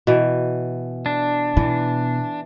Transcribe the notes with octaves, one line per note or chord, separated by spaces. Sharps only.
B2 E3
D4
B2 E3